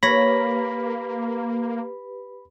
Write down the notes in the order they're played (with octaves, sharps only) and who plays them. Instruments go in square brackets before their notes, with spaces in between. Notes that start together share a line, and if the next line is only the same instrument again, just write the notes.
[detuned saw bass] A#3 [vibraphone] G4 B4 [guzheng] C#5 [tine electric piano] B5 A#6